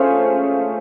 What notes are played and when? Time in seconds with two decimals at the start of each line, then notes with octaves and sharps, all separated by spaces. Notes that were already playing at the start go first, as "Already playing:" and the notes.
Already playing: A3 C#4 F4 G#4 C5